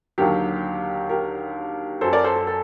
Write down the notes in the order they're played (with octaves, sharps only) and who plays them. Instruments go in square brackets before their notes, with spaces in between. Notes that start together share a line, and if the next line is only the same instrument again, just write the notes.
[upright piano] D#2 D3 F#3 G4 A#4
G4 A#4
F#2 F#3 A4 C5
A#4 D5
A4 C5
A4
A4